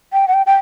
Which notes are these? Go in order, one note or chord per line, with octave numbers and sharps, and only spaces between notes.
G5
F#5
G5
G5